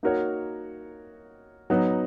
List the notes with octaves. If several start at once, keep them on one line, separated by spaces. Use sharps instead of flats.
A#3 D#4 F#4 A#4 C#5
F#3 B3 D#4